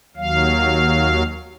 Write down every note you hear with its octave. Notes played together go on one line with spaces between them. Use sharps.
D#2 F#3 F5